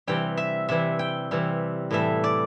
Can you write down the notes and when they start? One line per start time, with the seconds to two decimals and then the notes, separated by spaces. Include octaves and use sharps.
0.07 C3 E3 G3 G5
0.37 E5
0.69 C3 E3 G3 E5
0.99 G5
1.31 C3 E3 G3
1.91 A2 E3 G3 E5
2.24 D5